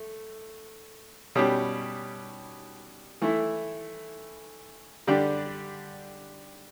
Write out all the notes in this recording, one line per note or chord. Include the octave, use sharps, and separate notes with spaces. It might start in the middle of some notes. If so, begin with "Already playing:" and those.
Already playing: A3
B2 G3 C#4 G4
E3 A3 E4
D3 G3 D4 G4 D5